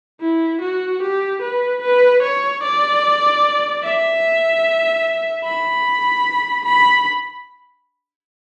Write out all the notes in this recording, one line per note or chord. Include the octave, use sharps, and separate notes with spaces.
E4
F#4
G4
B4
B4
C#5
D5
E5
B5
B5